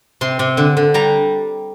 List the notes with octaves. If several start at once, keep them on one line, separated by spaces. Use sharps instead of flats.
C3 C6
C3
D3
D3
G3 A#5